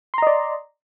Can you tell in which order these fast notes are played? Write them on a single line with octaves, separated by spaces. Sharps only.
C6 A#5 D#5 D5